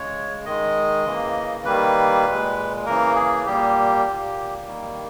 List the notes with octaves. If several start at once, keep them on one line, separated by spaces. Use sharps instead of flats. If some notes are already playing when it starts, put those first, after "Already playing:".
Already playing: C#3 G#3 C#5
D#3 G#3 D#5
C#3 E3 A#3
D#3 G3 A#3 B4
A#2 G#3
C#3 E3 A#3 A#4
G#4
A#2 G3 A#3 G4
A#2 A#3
D#3 G3 A#3